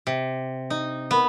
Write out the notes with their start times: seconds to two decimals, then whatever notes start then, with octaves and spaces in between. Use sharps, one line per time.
0.07 C3
0.70 D#4
1.11 B3 A#4 B5